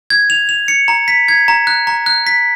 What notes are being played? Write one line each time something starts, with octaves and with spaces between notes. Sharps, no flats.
G#6
F7
F7
C#7
A#5
B6
G#6
A#5
F#6
A#5
F#6
B6